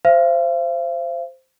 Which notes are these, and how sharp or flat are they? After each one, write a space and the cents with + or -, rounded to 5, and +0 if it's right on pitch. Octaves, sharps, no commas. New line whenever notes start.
C5 +0 F5 -45